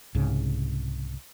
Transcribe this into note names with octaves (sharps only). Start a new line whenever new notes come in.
C2 G#2 C#3